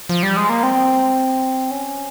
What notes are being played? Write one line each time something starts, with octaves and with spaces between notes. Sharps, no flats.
F3
G3
G#3
A#3
C4
C#4